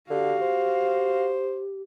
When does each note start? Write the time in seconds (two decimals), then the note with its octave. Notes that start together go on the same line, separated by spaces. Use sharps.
0.10 D3 F#4 G4 F5
0.42 C5